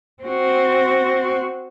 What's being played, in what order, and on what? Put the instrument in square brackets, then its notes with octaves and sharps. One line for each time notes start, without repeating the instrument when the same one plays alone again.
[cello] C4 F#4